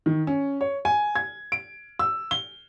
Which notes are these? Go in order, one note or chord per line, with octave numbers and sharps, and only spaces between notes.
D#3
C#4
C#5
G#5
G#6
D7
E6
G7